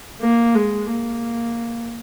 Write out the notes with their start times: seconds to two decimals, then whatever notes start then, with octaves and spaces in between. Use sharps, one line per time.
0.21 A#3
0.55 G#3
0.90 A#3